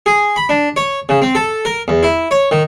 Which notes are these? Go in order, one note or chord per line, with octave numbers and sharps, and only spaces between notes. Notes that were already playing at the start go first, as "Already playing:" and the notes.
G#4
B5
D4
C#5
C#3
C4
A4
A#4
E2
E4
C#5
D#3